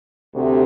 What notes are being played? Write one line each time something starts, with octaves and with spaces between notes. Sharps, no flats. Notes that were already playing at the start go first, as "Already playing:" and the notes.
D2 C3